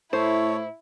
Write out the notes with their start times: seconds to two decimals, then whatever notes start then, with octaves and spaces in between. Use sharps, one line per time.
0.13 A2 A3 E4 C5 C#5